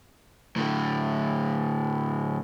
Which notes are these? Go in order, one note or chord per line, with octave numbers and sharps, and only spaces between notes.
A2 D3